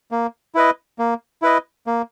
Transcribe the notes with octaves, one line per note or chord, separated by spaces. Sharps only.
A#3
E4 B4 D#5
A#3
E4 B4 D#5
A#3